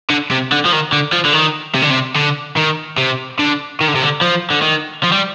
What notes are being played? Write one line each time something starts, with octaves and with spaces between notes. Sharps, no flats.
D3
C3
D3
F3
D#3
D3
F3
D3
D#3
C3
D3
C3
D3
D#3
C3
D3
D#3
D3
C3
D3
F3
D3
D#3
F3
G3